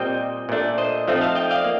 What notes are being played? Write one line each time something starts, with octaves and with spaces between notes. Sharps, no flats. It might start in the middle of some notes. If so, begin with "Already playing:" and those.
Already playing: A#2 G3 C4 D#5 G5
A#2 A3 D4
C5 D#5
F3 A3 C4 D#4
F5 A5
D#5 G5
D5 F5
A#3